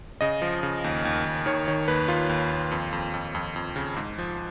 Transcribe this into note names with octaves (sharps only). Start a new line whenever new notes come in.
C#3 D#5
F3
C#3
D#2
D#2
D#2
D#3 C#5
D#3 C#5
D#2 B4
D#3 F4
D#2
D#2
F2
F2
F2
F2
F2
C#3
G#2
F3